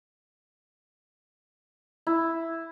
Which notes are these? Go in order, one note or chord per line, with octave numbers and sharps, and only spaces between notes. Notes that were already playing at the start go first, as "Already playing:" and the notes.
E4